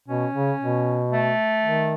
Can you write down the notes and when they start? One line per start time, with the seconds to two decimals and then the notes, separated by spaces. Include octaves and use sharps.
0.08 B2 C#4
0.35 C#3
0.61 B2
1.12 A3
1.64 D#3